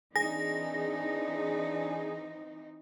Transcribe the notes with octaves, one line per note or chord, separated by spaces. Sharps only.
E3 C4 D4 D#4 G#4 A#6